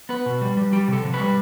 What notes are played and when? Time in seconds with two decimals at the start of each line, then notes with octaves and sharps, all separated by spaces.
0.09 B3 B4
0.26 B2
0.41 G3
0.57 G3
0.73 G3 G4
0.88 C3 A4
1.04 C3
1.13 B4
1.19 G3